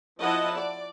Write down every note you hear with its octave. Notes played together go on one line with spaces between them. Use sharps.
F3 E4 D#5 F#5 A5
D5